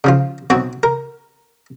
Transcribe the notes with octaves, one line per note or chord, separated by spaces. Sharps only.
C#3 F3 F4
B1 C4 F#4 C#5
A#4